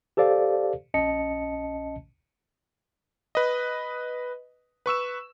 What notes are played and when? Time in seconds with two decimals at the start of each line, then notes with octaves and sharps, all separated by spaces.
0.17 G4 A4 C5 D5 F5
0.94 A#1 C#4 D#5 A5 C#7
3.35 B4 D#5
4.86 B4 C#6 E6 E7